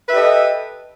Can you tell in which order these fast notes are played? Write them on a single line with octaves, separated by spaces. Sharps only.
B4 E5 G4 D#5 A4